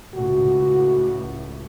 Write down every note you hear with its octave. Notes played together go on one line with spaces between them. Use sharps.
C#2 A2 F#4